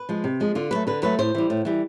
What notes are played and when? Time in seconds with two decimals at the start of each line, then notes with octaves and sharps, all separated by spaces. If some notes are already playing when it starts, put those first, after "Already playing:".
Already playing: B4
0.09 F3 G#3
0.24 C3
0.40 F3 G#3
0.55 D3 F4
0.71 F#3 A3 B4
0.87 D3 B4
1.03 F#3 A3 B4
1.19 A2 C5
1.35 E3 G3
1.50 A2
1.65 E3 G3